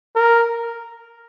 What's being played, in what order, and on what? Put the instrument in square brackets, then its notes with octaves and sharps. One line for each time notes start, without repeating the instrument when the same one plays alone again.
[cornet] A#4